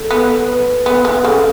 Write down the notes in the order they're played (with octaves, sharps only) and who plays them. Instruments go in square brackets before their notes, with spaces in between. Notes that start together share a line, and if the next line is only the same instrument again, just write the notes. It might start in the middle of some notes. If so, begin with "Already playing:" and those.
Already playing: [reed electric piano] A4
[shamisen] B3
[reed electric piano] B4
[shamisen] B3
B3
[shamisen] C#3 [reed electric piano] A4